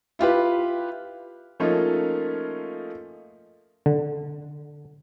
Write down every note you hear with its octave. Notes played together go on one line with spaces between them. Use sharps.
E4 F4 G4 B4
F3 A3 A#3 C#4 D#4 F4
D3